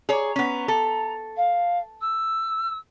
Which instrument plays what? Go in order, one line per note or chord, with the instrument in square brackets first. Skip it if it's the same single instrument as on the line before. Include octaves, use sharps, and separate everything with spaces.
[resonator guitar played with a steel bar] G#4 C#5 [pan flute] A#5
[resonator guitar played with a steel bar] B3 C#4
A4
[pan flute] F5
E6